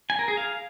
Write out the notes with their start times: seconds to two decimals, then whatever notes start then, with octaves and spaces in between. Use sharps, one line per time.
0.10 G#5
0.19 A#4
0.28 G#4
0.37 F5